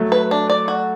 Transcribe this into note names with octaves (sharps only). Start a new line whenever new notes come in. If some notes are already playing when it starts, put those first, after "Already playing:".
Already playing: F#3 A3
B4
D4
D5
F#4